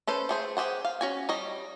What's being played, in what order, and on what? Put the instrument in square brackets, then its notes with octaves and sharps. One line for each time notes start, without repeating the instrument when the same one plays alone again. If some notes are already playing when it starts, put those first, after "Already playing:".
[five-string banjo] C#4 A4 B4 C5
A3 G#4 C5
G4 G#4 C5 F#5
F5
C#4 F#4 G#5
G3 C#5 D#5